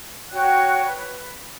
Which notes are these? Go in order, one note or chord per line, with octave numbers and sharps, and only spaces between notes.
F#4 C#5 G5 F#6
B4